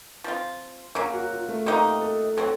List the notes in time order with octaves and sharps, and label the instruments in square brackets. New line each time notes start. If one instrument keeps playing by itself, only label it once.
[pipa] F3 C4 F4
[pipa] C#3 F#3 A#3 [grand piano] A#4
[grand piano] F#4
F4
A3
[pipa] C3 D#3 A#3 D#4 [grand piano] F#4
[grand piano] A4
[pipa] F#3 C4 F#4 [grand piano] A4